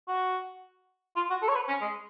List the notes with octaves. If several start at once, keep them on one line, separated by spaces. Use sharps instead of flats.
F#4
F4
F#4
A4
C#5
B4
C#4
G#3